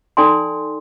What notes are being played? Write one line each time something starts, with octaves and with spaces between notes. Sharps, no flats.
D#4 A4 D5 G5 G#5 C6